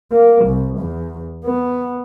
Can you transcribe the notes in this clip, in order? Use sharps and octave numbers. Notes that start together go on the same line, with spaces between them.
A#3
C2
E2
B3